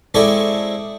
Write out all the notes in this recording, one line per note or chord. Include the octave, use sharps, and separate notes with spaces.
G#3 C4 E4 A4 D5 C#6